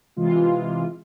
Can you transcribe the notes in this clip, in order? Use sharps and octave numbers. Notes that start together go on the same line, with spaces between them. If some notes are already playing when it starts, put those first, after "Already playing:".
C3 E3 G#3 F4